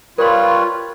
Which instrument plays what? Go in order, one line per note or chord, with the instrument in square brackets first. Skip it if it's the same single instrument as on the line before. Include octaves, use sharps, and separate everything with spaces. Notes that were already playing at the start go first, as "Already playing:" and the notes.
[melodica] G3 B4 C#5 [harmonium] F4 [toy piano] A#4 C6